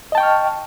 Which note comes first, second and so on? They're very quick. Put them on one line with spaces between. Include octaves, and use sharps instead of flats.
D#5 A5 G5 C#6 F6